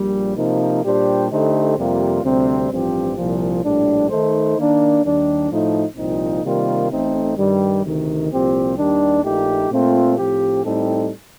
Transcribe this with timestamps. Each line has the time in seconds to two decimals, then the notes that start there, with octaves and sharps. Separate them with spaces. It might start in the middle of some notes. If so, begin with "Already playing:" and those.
Already playing: A#1 A#2 G3
0.35 C3 F3 A#3 D#4
0.83 A#2 G3 D4 G4 C5
1.30 D3 A3 D#4 G4 C5
1.77 F2 C3 G3 A#3 F4
2.23 D2 C3 G3 C4
2.70 A1 G2 F3 C4 G4
3.16 C2 A#2 F3
3.63 A#1 A2 G3 D4
4.10 D#3 A3 D#4 A4 C5
4.57 D#3 A#3 D4
5.03 D#2 D#3 G3 D4
5.50 A2 F3 A3 D#4
5.96 C2 A#2 F3 C4 D#4
6.42 C3 D#3 G3 A#3 F4
6.90 A1 A2 A3 C4 D#4
7.36 G2 D#3 G3
7.84 D2 C3 D#3
8.29 C2 A#2 F3 C4 G4
8.76 D#2 D#3 G3 D4
9.23 A#1 A#2 A3 D#4 G4
9.69 A#2 A3 C4 F4
10.17 A2 F3 C4 G4
10.63 A2 G3 C4 D#4 A4